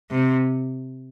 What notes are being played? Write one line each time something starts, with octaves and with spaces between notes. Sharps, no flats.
C3